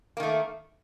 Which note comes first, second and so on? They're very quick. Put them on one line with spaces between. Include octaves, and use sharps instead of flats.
A#3 D#3 A3